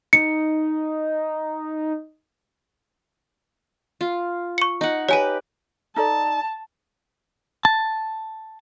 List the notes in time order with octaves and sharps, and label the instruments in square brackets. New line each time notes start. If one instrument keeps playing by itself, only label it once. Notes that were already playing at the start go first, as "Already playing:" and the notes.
[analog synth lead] D#4 [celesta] C#7
[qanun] F4
[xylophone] C#6 C#7
[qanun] D#4 F#5
[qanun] G4 B4 [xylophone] C#5 G#5 D#7
[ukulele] D#4 A4 D5 [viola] A5
[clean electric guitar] A5